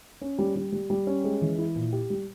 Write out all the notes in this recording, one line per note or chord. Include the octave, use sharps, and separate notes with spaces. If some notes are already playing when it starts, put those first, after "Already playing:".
C#4
G3
G3
G3
G3
C#4
G#3
E3
E4
A#2
G4
G3